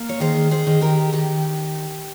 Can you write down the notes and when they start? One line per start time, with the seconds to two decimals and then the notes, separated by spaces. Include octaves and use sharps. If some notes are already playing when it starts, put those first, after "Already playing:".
Already playing: A#3
0.09 C#5
0.20 D#3 G#4 C5
0.51 G#4 C5
0.67 D#3
0.81 G4 A#4
1.13 D#3 G4